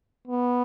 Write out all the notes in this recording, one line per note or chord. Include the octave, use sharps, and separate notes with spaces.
B3